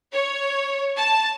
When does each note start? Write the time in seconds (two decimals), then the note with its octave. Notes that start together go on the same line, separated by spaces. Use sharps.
0.14 C#5
0.97 A5